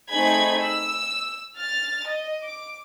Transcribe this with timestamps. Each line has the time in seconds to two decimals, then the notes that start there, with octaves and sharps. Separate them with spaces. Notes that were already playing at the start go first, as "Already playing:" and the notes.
0.10 A3 C4 D#4 G#4 B5 G#6
0.63 E6
1.56 F6 A6
2.06 D#5
2.41 D6